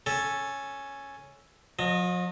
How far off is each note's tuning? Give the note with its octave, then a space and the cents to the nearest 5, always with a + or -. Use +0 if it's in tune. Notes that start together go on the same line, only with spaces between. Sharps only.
C#4 +0 A4 +0
F3 +45 D#5 -15